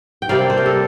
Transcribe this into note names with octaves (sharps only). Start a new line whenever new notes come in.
G5
C3 G3 A#3 D4 D5 F5
C5
A#4
A4